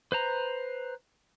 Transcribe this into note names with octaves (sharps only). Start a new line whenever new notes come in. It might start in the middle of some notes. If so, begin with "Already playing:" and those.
B4 C5 A#5